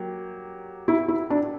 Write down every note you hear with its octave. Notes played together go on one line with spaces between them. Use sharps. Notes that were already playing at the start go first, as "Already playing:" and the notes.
Already playing: F#3 A#3 G4
E4
E4
D4